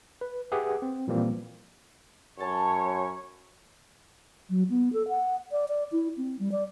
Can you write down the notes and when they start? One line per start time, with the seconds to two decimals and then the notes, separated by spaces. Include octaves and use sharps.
0.21 B4
0.52 G4 G#4 B4 E5 F#5
0.82 C4
1.07 A#2 E3 F3 G3 A#3 C4
2.39 F#2 A4 C#5 A5
4.50 F#3
4.70 B3
4.93 A4
5.09 F#5
5.52 D5
5.68 D5
5.92 E4
6.17 C4
6.39 G3
6.52 D5